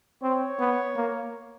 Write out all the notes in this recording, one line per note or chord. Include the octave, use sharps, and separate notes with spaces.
C4 C#5
B3
A#3